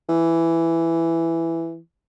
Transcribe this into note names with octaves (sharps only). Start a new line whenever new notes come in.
E3